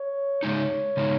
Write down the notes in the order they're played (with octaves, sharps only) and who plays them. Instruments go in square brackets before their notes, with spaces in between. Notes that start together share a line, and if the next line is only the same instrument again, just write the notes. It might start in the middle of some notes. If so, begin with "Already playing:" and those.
Already playing: [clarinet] C#5
[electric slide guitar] C#3 G#3 D#4 [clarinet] C#5
[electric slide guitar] C#3 G#3 D#4